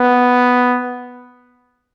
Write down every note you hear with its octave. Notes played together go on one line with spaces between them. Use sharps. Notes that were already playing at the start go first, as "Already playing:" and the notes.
Already playing: B3